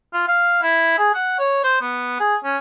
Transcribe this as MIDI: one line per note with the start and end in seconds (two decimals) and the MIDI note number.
0.13 0.26 65
0.28 0.60 77
0.63 0.97 64
0.98 1.13 68
1.14 1.34 78
1.39 1.59 73
1.64 1.78 72
1.81 2.17 59
2.20 2.36 68
2.44 2.57 61